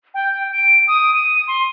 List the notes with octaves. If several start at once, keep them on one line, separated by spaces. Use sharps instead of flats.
G5
D7
D#6
D#7
C6